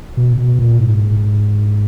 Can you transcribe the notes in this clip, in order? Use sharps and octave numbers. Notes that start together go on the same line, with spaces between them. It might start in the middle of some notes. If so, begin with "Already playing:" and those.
B2
B2
A#2
G#2